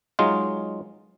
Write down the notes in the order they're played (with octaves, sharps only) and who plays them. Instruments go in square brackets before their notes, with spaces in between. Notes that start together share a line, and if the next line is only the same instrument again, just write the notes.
[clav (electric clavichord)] F#3 G#3 D#4 F4